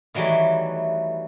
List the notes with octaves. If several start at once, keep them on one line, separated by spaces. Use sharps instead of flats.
D#3 E3 F#3 G3 A3